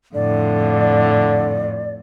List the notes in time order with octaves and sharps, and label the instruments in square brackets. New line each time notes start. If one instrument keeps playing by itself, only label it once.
[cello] F2 A2 [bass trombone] D3 [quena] D5